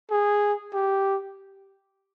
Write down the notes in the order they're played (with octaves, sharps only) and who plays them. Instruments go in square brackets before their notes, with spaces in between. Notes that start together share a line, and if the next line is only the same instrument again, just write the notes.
[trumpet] G#4
G4